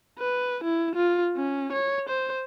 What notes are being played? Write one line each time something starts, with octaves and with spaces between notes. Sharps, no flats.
B4
E4
F4
C#4
C#5
C5